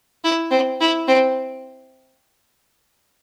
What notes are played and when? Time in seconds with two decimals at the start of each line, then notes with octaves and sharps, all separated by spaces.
0.24 E4
0.51 C4
0.81 E4
1.08 C4